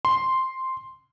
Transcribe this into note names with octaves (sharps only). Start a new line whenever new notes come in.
C6